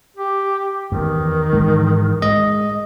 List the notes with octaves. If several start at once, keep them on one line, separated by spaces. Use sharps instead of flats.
G4
E2 D#3
G#2 E3 G#3
G#3 D#5